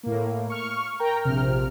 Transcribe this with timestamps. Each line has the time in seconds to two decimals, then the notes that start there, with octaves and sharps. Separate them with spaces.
0.03 A2 A#3
0.50 C#6 F6
1.00 A#4 G5 A#5
1.23 A#1 C3 F6